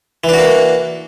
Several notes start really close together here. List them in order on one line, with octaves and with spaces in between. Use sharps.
E3 D4 F#4 A#3